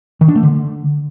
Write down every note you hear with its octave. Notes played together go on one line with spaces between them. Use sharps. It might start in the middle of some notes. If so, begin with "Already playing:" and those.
D#3
D4
A3
D3